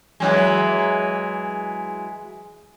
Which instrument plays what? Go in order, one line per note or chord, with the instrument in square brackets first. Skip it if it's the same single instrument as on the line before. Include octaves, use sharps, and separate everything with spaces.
[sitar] E3 F#3 G#3